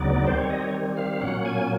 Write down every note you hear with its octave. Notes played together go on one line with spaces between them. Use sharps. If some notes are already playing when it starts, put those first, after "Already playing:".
Already playing: D2 C#3 F#3 B3 D#4 D5
D#3 G3 C4 C5
C#5
D#5
C#5
F5
A#2 F#3 A#3 C#4 F#5
G#5